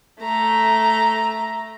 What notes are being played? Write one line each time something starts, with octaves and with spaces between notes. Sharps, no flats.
A3 A#5